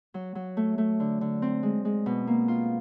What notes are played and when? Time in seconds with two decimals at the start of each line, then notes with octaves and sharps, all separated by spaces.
0.14 F#3
0.35 F#3
0.57 A3
0.78 A3
1.00 D3
1.21 D3
1.42 C4
1.63 G#3
1.85 G#3
2.06 B2
2.27 A#3
2.48 F4